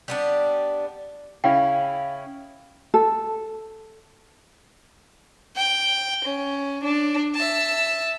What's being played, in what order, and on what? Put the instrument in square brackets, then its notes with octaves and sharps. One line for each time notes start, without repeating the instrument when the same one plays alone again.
[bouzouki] G3 B3 D4
[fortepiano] C#3 C#4 E4 [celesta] F5 G5
[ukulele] A4
[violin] G5
C#4
D4
E5 A5